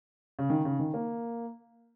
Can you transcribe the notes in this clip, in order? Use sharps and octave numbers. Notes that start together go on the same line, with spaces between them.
C#3
D#3
C#3
D#3
A#3